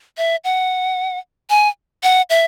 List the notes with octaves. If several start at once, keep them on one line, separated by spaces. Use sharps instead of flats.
E5
F#5
G#5
F#5
E5